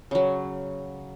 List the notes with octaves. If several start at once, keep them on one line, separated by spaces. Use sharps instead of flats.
C#3 F#3